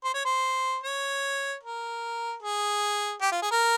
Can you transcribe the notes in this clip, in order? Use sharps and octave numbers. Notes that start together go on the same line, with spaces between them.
C5
C#5
C5
C#5
A#4
G#4
G4
F4
G#4
A#4